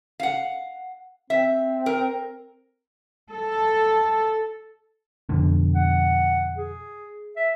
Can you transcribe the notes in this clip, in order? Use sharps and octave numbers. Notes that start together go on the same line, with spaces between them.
F5 F#5
C4 E5
A#4
A4
F2 B2 D3
F#5
G#4
E5